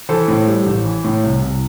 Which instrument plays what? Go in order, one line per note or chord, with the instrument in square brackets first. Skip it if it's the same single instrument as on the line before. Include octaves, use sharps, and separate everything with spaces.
[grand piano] E3 A4 C5
A2
G3
A1
E3
A2
C2
C2